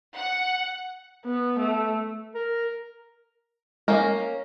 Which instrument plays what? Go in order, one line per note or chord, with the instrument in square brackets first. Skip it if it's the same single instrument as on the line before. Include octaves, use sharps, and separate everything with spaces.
[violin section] F#5
[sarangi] B3
A3
[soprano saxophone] A#4
[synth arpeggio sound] G#3 [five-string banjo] A#3 C#4 A#4